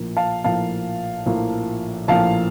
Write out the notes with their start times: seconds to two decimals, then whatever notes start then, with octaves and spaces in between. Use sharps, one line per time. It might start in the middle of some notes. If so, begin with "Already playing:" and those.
Already playing: A#1 A2 F3 A#3
0.17 F5 A5
0.44 A#1 A2 F3 A#3 F5 A5
1.26 A#1 A2 F3 A#3
2.08 A#1 A2 F3 A#3 F5 A5